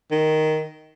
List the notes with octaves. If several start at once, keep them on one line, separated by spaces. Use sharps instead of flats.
D#3